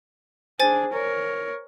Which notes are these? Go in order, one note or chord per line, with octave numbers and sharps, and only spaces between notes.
D4 G#4 C5 G#5 A6
A#4 C#5